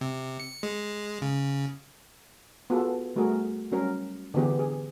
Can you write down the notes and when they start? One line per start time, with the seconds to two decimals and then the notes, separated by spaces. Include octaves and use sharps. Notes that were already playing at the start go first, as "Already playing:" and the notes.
0.01 C3
0.40 C#7
0.63 G#3
1.22 C#3
2.70 B3 F4 F#4 G#4 A4
3.16 G3 A3 F#4 G#4 A#4
3.72 F#3 G3 C#4 A#4
4.34 D3 E3 B3 G4 G#4
4.59 G#4